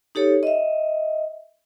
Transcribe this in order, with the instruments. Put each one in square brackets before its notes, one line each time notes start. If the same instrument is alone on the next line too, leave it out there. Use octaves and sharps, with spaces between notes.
[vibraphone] D#4 G4 A4 C#5
D#5 E5